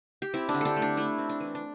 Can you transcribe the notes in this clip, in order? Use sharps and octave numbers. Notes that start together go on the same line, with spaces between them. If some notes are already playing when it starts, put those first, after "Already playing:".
G4
C4 E4
D4
D3
D4 G4 A4
A3
D4
A3 E4
C4
D4
E3
D4